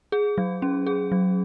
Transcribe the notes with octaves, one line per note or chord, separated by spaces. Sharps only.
G#4
F#3
C#4
G#4
F#3